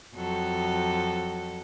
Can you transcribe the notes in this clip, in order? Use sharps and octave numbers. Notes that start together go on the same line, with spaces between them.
F2 F#3 A4